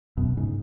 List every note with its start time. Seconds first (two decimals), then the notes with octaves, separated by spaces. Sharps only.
0.17 F#2 B2
0.37 G#2 C#3